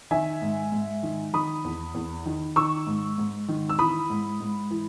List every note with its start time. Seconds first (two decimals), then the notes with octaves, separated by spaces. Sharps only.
0.11 D#3 E5 G#5
0.42 G#2
0.72 G#2
1.03 D#3
1.33 D#3 B5 D#6
1.64 E2
1.94 E2
2.26 D#3
2.56 D#3 C#6 E6
2.87 G#2
3.18 G#2
3.48 D#3
3.69 E6
3.79 E3 B5 D#6
4.10 G#2
4.40 G#2
4.70 E3